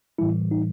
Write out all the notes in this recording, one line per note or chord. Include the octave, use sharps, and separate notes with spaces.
A2 E3 G3 E4
D#4